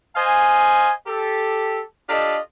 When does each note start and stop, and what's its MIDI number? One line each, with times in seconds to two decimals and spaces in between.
0.16 0.92 72
0.16 0.92 75
0.16 0.92 77
0.16 0.92 80
1.07 1.80 67
1.07 1.80 69
2.09 2.37 62
2.09 2.37 65
2.09 2.37 67
2.09 2.37 69
2.09 2.37 75
2.09 2.37 81